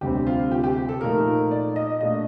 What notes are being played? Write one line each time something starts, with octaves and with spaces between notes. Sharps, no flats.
D2 C3 G3 C4 G4
F4
G4
G4
A4
A#2 F3 A3 D#4 A#4
D5
D#5
A#2 A3 D4 D#5